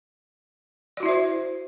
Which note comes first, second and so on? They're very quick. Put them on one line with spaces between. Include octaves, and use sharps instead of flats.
D5 F#4 E4 E5 C5